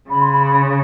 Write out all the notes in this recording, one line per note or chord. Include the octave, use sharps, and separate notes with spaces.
C#3 B5
C6
B5
B5